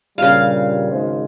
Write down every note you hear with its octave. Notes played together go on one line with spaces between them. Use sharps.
G2 A#2 C#3 G3 F5
G#1 G#3 C5